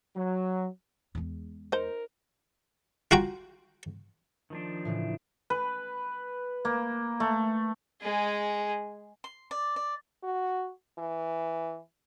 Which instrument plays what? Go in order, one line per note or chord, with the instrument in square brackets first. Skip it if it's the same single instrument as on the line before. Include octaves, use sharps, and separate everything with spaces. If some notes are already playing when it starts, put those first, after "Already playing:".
[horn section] F#3
[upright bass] E2 G#3
[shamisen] D#4 C5 [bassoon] A#4
[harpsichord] F4 F#4 G5 A#5
[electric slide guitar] D#3 F3 D4
[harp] A2 C#3 E3
[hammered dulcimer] B4
A#3
A3
[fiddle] G#3 G#4
[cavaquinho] C6
D5
D5
[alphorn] F#4
E3